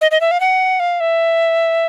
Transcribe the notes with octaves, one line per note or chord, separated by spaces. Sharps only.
D#5
D#5
E5
F5
F#5
F5
E5